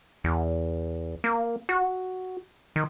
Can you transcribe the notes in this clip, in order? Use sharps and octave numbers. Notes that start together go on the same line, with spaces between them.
E2
A#3
F#4
D#3